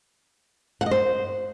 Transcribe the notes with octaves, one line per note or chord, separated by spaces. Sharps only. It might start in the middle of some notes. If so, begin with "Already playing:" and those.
F#5
D#5
C5